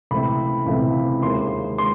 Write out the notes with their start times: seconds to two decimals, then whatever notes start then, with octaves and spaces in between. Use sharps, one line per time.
0.11 C#2 C3 E3 A3 C4 B5
0.67 C#2 C3 E3 A3 C4
1.23 D#2 D#3 G#3 C6
1.78 G#3 C6